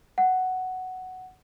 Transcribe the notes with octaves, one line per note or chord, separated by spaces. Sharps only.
F#5